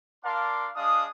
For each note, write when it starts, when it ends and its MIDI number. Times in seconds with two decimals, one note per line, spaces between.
0.24 0.68 62
0.24 0.68 70
0.24 0.68 74
0.24 0.68 77
0.24 0.68 81
0.24 0.68 84
0.75 1.05 56
0.75 1.05 62
0.75 1.05 77
0.75 1.05 87